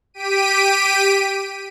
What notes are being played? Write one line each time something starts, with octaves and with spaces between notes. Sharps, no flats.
G4 B6 D7 D#7